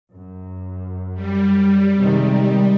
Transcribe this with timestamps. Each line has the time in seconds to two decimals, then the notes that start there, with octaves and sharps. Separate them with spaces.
0.13 F#2
1.14 G3
2.01 C3 D#3 G#3